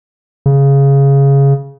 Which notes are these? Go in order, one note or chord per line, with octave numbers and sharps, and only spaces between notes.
C#3